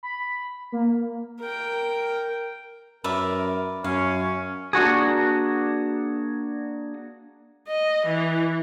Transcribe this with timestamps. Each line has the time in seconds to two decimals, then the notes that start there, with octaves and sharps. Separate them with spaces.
0.03 B5
0.72 A#3
1.40 A#4 G5
3.04 F#2 A#4 B4 D5 E5
3.84 F#2 C#4 F5
4.22 C#4
4.73 A#3 D4 F#4 G#4
7.68 D#5
8.07 E3